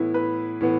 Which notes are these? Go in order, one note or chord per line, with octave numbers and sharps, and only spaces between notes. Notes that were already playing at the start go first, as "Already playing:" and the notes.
Already playing: A2 E3 B3 E4
B4
A2 E3 B3